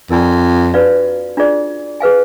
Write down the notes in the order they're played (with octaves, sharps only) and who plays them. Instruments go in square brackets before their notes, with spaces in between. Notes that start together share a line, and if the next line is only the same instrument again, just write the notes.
[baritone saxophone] F2 [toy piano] A#4 D5 G#5 B5
[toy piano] D4 F#4 B4 D5 F5
D4 F4 G#4 D5
G#4 B4 F5 G#5